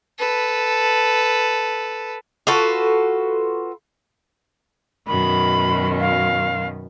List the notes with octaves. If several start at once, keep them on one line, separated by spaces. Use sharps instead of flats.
A4 B4
F4 F#4 A4 B4
F#2 B2 D#3 B5
F5